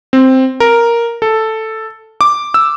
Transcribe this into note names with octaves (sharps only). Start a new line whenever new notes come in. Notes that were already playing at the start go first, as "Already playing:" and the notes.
C4
A#4
A4
D6
E6